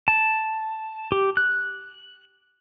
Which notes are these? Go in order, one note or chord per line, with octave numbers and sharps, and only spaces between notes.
A5
G4
F#6